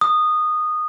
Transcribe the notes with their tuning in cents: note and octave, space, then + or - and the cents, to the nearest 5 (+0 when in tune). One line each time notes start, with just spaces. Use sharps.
D#6 -15